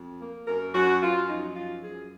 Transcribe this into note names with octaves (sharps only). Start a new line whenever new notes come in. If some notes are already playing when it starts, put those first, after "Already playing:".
Already playing: F2
A#3
F#2 A#4
F#2 F#4
F#2 F4
F3 D#4
F#2 F4
F#2 G#4